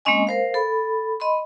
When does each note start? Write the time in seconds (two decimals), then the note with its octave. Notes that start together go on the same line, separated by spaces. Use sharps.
0.05 G#3 A#3 C4 C#4 D#5 G#5
0.27 A#4 C5 F5
0.54 A4 B5
1.20 D#5 B5 C6